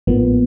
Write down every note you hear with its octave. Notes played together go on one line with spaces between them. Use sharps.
A1 G#2 F3 A#3 B3